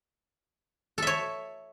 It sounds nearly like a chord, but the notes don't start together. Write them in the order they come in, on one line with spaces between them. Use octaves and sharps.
A4 E5 C#5